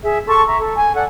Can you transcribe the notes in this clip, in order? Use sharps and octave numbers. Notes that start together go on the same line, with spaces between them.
G#4 E5
A4 A5 C6 C#6
E5 A#5
A4
G#5
A4 D5 F#5